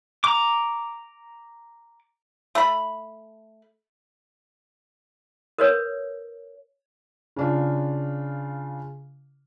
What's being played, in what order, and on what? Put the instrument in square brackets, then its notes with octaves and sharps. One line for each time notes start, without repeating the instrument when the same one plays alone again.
[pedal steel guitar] A#5 D6
[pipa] A3 B5
[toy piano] A#4 B4 C#5
[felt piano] C#3 D4 F4